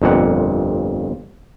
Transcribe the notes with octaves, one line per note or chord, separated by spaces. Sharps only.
G1 F2 A#2 F#5